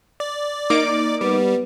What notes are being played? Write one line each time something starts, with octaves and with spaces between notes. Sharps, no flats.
D5
A#3 D#4 D6
G3 B3